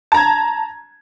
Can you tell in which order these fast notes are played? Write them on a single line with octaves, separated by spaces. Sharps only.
A5 A#5 G#6